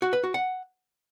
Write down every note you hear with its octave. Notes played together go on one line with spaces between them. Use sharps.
F#4
B4
F#4
F#5